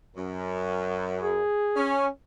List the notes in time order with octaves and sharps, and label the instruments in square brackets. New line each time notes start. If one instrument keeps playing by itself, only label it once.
[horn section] F#2
[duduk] G#4
[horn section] C#4